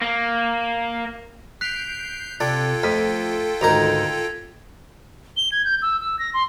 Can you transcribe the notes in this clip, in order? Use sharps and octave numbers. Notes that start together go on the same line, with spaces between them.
A#3
F#6 G6 B6 C7 D7 F7
C3 D4 F4 A4 G5 G#6 A6
F2 A3 F6 B6 D#7
D2 G#2 D#3 A#4 G#6 A#6 F7
G7
G#6
G6
E6
E6
A#6
C6